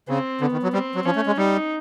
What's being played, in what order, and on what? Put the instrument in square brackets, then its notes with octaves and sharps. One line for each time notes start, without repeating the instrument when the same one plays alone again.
[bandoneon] C#3 [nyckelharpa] C4
[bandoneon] D3 [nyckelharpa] B3
[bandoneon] D#3
F#3
[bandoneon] G3 [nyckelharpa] C4
[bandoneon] F#3
[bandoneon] F3 [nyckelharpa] C#4
[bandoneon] A3
G#3
[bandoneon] G3 [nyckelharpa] D#4